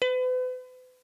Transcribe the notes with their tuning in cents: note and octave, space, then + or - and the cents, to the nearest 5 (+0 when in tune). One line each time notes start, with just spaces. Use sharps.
B4 +40